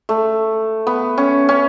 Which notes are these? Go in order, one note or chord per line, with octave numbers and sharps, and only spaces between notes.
A3
B3
C#4
C#4